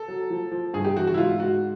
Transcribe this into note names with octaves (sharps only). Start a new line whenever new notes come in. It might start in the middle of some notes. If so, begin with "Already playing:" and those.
Already playing: A4
F#3
F3
F3
G2 G#4
G4
E3 F#4
F#4
E4
G#2 F4
G#2 F#4